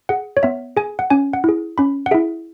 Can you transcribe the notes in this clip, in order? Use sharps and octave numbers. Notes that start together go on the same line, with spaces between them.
G#4 F#5
C#5
B3 E5
G#4 G#5
F#5
C#4 G#5
F#5
E4 G#4
C#4 B5
F#5
E4 G#4 E5